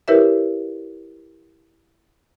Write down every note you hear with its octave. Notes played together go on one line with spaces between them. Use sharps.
E4 G4 A#4 B4 C#5 E5